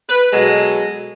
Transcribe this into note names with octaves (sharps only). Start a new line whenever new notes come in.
B4
B2 F#3 G#3 A4